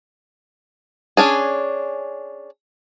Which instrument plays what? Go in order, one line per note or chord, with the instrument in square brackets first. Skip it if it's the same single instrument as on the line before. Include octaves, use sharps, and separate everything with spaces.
[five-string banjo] C#4 D4 G#4